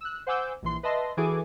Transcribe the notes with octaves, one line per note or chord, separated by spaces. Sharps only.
E6 F#6
C5 F#5 G#5 D6 E6 G6
A#1 E3 C6
B4 D#5 E5 A5 C6 A#6
E3 F#4 G#4 A4 G#5 D6